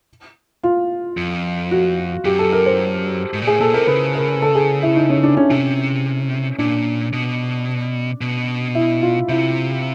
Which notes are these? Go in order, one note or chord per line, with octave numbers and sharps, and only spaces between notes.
F4
F2
F#4
F#2 G4
A4
A#4
C5
G#2
A#2
A2 G#4
A#2 A4
C3 A#4
C#3 B4
A#4
A4
G#4
E4
D#4
C#4
D4
C#4
C3 C#4
A#2 D4
B2
B2
E4
F4
C3 E4